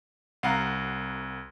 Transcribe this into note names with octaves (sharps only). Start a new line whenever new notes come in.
C2 F5 F#5 A#5